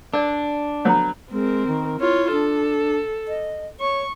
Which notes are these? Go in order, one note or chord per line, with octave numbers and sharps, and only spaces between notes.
D4 A#4 D5
D3 F#3 B3 C#5 A#5
G#3 C4 A#4
D#3
E4 F4 C#5
D4 A4
D#5
C#5 C#6